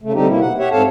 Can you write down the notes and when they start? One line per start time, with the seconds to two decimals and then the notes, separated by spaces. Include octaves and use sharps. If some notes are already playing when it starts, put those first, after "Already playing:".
0.01 C#3 A3
0.13 D3 G3 C4 D#4 G4
0.28 B2 A#3 E4
0.41 F#5
0.58 G4 C#5 E5 F#5
0.71 G#2 C4 A4 C#5 F5 A5